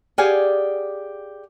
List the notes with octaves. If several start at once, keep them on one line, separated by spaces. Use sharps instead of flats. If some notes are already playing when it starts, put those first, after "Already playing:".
G4 G#4 D5 F5 F#5 G#5